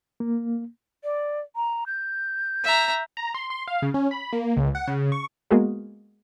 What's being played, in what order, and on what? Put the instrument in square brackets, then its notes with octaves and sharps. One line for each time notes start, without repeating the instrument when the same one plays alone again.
[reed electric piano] A#3
[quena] D5
A#5
G6
[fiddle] E5 A#5
[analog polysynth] A#5
C6
C6
F5
C#3
C#4
B5
A#3
C#2
F#5
C#3
C#6
[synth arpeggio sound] G#3 A#3 B3 F#4 G#4 A#4